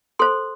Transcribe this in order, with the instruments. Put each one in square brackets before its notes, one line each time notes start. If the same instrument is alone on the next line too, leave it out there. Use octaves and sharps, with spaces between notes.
[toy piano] A4 C5 C6